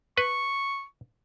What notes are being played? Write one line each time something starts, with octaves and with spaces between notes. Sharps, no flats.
B4 C#6